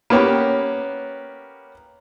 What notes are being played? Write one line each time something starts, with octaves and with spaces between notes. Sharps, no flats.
A#3 B3 C#4 G4